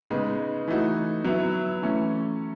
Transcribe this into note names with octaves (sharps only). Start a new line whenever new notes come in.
C#3 G#3 B3 D#4
E3 A3 D#4 F#4
F#3 B3 E4
E3 A3 C#4